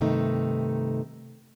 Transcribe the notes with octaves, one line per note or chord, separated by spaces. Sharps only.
G2 C3 D#3 A3 D#4